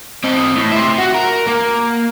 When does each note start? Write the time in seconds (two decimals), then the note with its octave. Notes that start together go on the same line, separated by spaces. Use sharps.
0.24 C4 D#5
0.56 A2
0.72 C5 E5
0.98 F#4
1.14 A#4
1.47 A#3